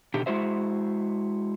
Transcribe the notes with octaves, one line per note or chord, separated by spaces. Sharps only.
B2 D3 D#3 G4
G#3 E4 F#4 C5 E5